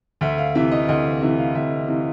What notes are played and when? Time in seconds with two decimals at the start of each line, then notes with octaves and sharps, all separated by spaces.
0.21 D2 E5
0.38 F5
0.55 C3 E3 E5
0.71 D#5
0.88 D2 D#5
1.22 C3 E3 E5
1.39 F5
1.55 D2 E5
1.88 C3 E3